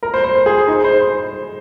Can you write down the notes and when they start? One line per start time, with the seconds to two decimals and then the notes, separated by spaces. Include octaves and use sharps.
0.03 A#4
0.14 C5
0.24 C5
0.36 C5
0.46 G#4
0.68 D#4
0.84 C5
1.01 C5